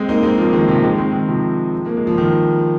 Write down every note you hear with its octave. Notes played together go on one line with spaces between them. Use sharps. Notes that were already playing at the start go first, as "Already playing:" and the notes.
Already playing: G#3 C4
A#3 D#4
G#3 C4
F3 A#3
D#3 G#3
C3 F3
D#3 G#3
G#3 C4
D#3 G#3
C3 F3
A#3
G#3
F3
D#3